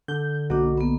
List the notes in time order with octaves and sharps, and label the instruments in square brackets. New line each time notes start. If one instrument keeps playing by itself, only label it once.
[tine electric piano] D3 [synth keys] G6
[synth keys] B1 [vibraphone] A#3 D4 [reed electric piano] F#4
[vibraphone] A#3 B3